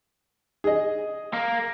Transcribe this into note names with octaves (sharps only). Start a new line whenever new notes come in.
G#4 D#5
A#3